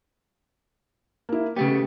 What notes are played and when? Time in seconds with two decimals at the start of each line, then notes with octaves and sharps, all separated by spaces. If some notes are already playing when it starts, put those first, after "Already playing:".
1.29 A#3 E4
1.56 C#3 A3 B3 G4